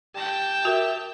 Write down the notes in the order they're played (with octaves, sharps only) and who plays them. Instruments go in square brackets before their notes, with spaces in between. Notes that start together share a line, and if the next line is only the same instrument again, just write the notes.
[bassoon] G4 [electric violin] G5 A5
[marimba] F#4 A#4 [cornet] E5